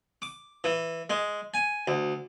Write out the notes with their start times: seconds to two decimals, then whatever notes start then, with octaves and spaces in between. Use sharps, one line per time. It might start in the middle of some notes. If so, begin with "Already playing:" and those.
0.22 D6
0.64 E3
1.10 G#3
1.54 G#5
1.88 D2